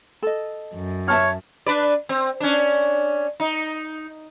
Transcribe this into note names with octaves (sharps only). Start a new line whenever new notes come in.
A4 D#5
F#2
C#5 E5 A5 F6
D4 B4 D5
C4
C#4 D4
D#4